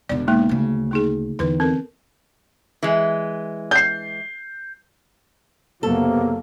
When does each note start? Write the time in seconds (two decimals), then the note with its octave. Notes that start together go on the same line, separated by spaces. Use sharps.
0.09 E1 D3 D5
0.28 G#3 A#3 D#4
0.49 D2 C#3
0.91 A#3 D#4 G#4
1.39 E2 D3 D#3 B4
1.60 C4 A4 A#4
2.83 E3 G#3
3.71 G6 C7
5.83 F#1 F#2 C3 F#3 A#3 B3 A4